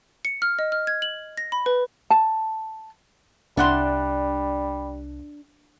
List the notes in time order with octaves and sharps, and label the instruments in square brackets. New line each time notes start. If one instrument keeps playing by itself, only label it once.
[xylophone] C#7
F6
D#5
F6
G#6
F#7
A#6
B5
B4
[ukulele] A5
[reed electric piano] C2 F#6 [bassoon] G3 [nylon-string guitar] D4 [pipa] E5 F#5 C6